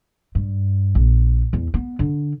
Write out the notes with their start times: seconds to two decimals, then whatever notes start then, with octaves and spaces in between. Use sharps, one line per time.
0.35 G2
0.95 A#1
1.53 E2
1.74 B3
1.99 D3